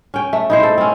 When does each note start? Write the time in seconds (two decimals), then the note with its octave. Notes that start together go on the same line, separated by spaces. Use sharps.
0.14 C#4 G5
0.33 A3
0.50 D#4 E4 C5
0.63 A4
0.78 C4 C#4